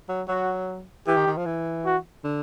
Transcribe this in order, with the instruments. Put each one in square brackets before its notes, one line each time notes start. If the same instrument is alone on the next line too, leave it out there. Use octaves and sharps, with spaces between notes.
[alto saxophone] F#3
[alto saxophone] F#3 [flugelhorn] F#4
[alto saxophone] E3 [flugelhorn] G4
[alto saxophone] D#3
D#3
F3
E3
[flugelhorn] F#4
[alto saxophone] D3